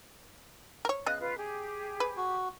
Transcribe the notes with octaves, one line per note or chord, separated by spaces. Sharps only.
A#4 C#5
C#3 B3 D#5 F5 F#6
F4 B4
G4 G#4
B4
F#4